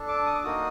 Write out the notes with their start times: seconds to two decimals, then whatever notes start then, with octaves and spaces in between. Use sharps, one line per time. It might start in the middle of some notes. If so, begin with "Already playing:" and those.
Already playing: D4 A4
0.08 D6
0.26 D#6
0.35 D6
0.44 A#3 D#4 F#4 D#6